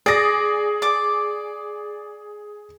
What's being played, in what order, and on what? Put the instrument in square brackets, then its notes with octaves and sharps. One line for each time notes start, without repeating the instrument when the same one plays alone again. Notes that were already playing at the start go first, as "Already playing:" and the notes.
[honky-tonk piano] G#4 A#6 [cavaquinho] D5 D#6
[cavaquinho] D5 D6